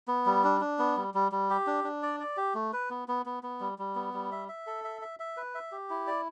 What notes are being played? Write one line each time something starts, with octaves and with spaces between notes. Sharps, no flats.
B3
G3
D4
D4
B3
G3
G3
G3
G4
D4
D4
D5
D5
G4
A3
B4
B3
B3
B3
B3
G3
G3
B3
G3
E5
E5
A4
E5
E5
E5
B4
E5
G4
E4
D5